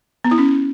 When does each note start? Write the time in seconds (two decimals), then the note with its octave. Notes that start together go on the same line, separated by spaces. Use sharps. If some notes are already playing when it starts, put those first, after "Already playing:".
0.25 B3
0.31 E4
0.38 C#4